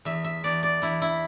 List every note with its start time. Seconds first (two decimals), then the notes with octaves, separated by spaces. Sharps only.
0.05 E2 E5
0.24 E5
0.44 E2 D5
0.63 D5
0.82 E2 E4
1.02 E4